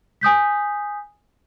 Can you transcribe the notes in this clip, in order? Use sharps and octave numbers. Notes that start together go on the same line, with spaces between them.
G#5 D#6 G6 B6